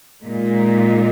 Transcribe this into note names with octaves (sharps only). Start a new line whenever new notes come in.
A#2 G#3 D#4